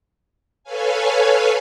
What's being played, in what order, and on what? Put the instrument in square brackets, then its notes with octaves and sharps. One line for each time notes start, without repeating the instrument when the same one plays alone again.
[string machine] A4 B4 C#5 F5 G#5